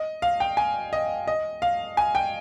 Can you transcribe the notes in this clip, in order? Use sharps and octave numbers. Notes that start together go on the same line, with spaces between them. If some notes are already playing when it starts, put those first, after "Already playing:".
Already playing: D#5
F5
G5
G#5
D#5
D#5
F5
G#5
G5